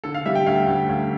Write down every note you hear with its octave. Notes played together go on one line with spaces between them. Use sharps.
D3 A4
F5
G3 E5
G5
D2 F5
D2
D2